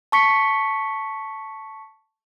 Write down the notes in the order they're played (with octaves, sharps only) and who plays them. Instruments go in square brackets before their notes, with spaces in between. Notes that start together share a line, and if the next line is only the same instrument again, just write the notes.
[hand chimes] A5 C#6 B6 C#7